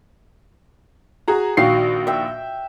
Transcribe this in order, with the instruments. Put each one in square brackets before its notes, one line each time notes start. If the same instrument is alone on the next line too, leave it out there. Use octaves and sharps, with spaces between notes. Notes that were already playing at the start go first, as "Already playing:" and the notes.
[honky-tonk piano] F#4 G#4 A#5
[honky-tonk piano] A#1 D#3 C7 [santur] F#4 F5 G5
[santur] E5 G5